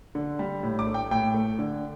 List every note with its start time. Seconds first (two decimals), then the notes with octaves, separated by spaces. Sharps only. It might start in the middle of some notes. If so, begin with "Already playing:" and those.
0.15 D3
0.39 G3
0.63 A2
0.79 D6
0.87 A3
0.94 G5
1.11 A2 G5
1.34 A3
1.59 D3